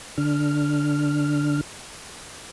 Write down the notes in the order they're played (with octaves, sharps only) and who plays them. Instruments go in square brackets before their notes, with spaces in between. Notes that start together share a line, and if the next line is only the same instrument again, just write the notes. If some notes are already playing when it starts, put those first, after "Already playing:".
[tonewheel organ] D3 D4 F6